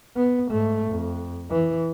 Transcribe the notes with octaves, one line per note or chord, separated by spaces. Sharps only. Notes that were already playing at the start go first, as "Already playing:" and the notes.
B3
G#2 A3
F2
E3